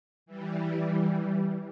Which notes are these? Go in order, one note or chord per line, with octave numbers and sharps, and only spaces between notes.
E3 G3